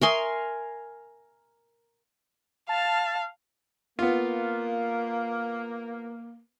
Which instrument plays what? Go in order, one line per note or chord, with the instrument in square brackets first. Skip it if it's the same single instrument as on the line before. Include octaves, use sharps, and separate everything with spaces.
[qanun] A#4 G#5 C6 [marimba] E5 C#6 D#6
[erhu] F5 [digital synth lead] A5
[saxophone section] A#3 [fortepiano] B3 F4